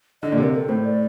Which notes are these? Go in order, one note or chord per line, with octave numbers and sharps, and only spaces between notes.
D3 D#5
A#2 D5
C3
A#4
A4
A2 C5
D5